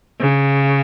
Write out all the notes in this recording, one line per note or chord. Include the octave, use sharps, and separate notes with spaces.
C#3